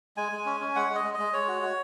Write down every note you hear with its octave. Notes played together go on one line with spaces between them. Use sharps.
G#3 G#5
G#3
C#4
C#4
G#3 F#5
G#3
D#5
G#3
D#5
G#3
G#3 C#5
F#4
F#4